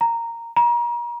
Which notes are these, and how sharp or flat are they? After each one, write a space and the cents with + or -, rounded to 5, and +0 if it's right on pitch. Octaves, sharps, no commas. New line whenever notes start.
A#5 -10
A#5 +35